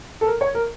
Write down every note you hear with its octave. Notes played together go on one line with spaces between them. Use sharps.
A4
A#4
C#5
A#4